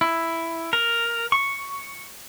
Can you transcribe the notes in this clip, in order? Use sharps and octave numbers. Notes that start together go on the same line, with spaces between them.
E4
A#4
C#6